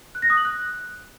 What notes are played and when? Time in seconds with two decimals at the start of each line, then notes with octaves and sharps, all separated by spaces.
0.15 F#6
0.22 A#6
0.30 D#6
0.37 F#7
0.45 F#6